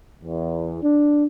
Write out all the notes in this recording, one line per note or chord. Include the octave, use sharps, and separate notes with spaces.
E2
D4